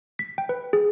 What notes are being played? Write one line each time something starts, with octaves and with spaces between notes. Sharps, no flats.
B6
G5
B4
G#4